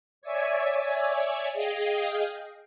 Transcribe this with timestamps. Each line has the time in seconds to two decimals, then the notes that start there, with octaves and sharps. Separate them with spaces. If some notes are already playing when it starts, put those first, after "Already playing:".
0.22 C#5 D5 E5 G#5
1.53 G#4 D#5 F5 G5